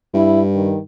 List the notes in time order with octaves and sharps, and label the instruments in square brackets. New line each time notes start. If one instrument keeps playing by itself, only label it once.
[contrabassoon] G2 [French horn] E4
[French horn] D#3